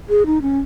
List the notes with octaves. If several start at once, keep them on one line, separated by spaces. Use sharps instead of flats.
G#4
D#4
C#4